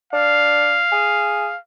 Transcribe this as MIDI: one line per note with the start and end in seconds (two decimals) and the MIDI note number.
0.13 0.80 62
0.13 1.58 77
0.92 1.50 68